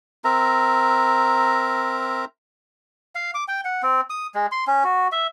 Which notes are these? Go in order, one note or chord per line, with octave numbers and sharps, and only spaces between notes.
C4 A#4 E5 A#5
F5
D6
G5
F#5
C4
D#6
G#3
C6
C#4
F#4
E5